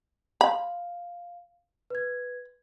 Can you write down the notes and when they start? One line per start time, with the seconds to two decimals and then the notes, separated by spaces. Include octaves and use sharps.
0.41 F5 B5
1.90 B4 G#6